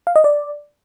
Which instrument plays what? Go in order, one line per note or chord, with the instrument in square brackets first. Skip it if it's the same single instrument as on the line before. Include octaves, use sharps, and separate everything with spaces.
[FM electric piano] F5
D#5
D5